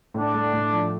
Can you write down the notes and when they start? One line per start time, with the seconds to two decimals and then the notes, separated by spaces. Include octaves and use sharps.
0.14 A2 D4
0.34 A3
0.53 A2
0.73 F3